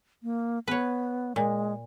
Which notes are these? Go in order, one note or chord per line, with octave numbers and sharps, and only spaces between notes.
A#3
B3 B4 C#5
A#2 G#3